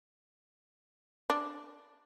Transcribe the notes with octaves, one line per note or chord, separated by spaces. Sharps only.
D4